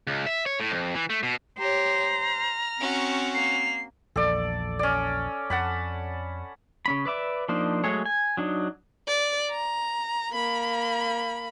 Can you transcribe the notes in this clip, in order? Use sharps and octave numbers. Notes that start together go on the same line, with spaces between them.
C#2
E5
C#5
A2
F2
E3
A3
B2
G4 C5 C#5 A#5
F6
C4 C#4 F#4
A#3 C7 F7
A#1 E2 A4 D5
C#4 D5
F2 F#5 A5 B5
C#3 C#4 B5
B4 D5 E5 D6
F3 A#3 D4 D#4 C5
F#3 G#3 A3 G#4 C#5
G#5
F#3 D4 D#4
D5
A#5
A#3 B5